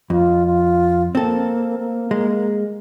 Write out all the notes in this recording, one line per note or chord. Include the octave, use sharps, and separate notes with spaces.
F2 F4
F4
A#3 C4 A4
A#3
G#3